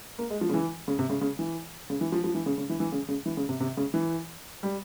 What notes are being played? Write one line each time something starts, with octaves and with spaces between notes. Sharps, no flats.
A#3
G#3
F3
C#3
E3
C#3
C3
C#3
C#3
E3
C#3
E3
F3
F3
E3
C#3
C#3
E3
E3
C#3
C#3
E3
C#3
C3
C3
C#3
E3
G3